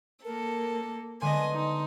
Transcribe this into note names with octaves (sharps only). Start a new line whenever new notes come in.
A#3 A4 A#4
D3 G#3 B3 D#5 G#5 C6
D#4